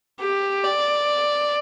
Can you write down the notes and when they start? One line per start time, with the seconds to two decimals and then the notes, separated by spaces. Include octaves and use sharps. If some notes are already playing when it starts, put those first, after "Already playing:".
0.21 G4
0.64 D5